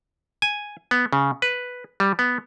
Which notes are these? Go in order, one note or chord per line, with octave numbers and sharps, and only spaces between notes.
G#5
B3
C#3
B4
G3
B3